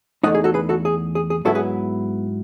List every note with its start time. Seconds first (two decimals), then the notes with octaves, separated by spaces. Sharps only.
0.23 E2 D#3 A3 D#4 D#5 F#5
0.35 G#4
0.44 F#4 A4
0.54 G#4 B4
0.69 F#4 A4
0.85 G#4
1.15 G#4
1.30 G#4
1.45 G#2 F#3 B3 E4 F#4 A4
1.55 G#4 B4